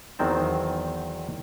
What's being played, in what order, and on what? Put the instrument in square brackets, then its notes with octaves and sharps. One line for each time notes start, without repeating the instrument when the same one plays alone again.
[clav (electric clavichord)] E2 D#3 F#3 C4 C5 A5